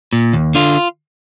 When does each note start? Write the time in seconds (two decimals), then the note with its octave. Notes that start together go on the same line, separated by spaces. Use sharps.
0.13 A#2
0.33 D#2
0.55 D3 F4